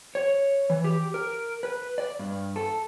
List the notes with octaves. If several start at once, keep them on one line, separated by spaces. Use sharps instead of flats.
C#5
E3
G4
A#4
B4
D5
G2
A4